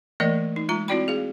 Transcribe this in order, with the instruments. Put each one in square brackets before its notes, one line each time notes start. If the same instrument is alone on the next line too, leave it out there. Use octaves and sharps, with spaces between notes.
[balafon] E3 A3 A#3 A#4 D5 D#5
D#4
G#3 F4 A#5
C4 E4 F#4 D5 G5 B5
G#4 F5